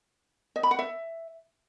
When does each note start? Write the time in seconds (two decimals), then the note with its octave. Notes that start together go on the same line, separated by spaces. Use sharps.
0.56 D#5
0.63 B5
0.71 F#5
0.79 E5